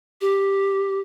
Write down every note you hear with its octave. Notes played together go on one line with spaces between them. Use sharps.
G4